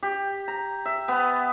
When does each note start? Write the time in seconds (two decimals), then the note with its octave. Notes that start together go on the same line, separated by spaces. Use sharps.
0.03 G4
0.48 A#5
0.86 E5
1.08 B3